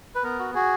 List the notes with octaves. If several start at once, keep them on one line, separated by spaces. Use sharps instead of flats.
B4
B3 A#4
F#4
F#4 G#4